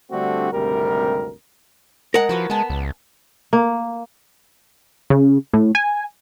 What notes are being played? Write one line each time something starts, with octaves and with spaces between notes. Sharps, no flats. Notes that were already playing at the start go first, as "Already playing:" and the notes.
D3 G3 A3 C4 D4 F#4
G#1 D2 C3 G3 A#4
G#3 A#4 F#5
F3 E4 F#4 B4
G#3 B3 G#5 A5
C#2
A#3
C#3
A2
G#5